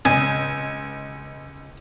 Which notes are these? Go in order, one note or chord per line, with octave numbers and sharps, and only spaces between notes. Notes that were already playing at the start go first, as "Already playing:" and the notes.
C#2 G#5